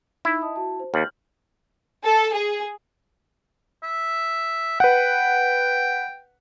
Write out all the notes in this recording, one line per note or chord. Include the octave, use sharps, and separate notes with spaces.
D#4 E4
D#5 A5 D#6
F#4 A5
C5
D#2 F6 G6 F#7
A4
G#4
E5
B4 F#5 G5